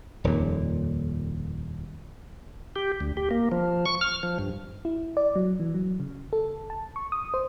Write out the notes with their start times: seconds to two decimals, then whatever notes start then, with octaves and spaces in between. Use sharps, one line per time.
0.24 D#1 F2 A#2
2.76 G4
3.00 D2
3.17 G4
3.31 A#3
3.52 F3
3.86 C#6
4.01 F6
4.23 F3
4.39 G2
4.85 E4
5.17 D5
5.35 F#3
5.60 E3
5.74 F#3
6.00 C#3
6.33 A4
6.70 A5
6.96 C#6
7.12 D#6
7.34 C5